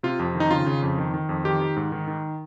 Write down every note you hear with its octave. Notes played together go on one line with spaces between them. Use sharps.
C3 F4
F2
D#3
D#4
C#3 F4
C#3
F2
D#3
D#3
F2
D#3 G4
D#3
G#2
D#3
D#3